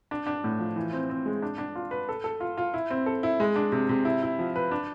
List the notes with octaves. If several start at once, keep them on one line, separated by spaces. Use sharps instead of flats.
D4
D4
A2
F3
E3
C4
C4
G#3
D4
D4
F4
B4
A4
A4
F4
F4
E4
C4
A4
E4
G#3
D4
C3
C3
E4
E4
F3
B4
D4